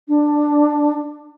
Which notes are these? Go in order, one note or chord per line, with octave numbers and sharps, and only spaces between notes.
D4